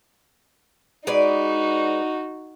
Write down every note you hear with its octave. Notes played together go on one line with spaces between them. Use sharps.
G#3 D#4 F#4 B4 D5